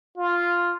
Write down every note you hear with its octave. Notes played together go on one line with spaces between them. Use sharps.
F4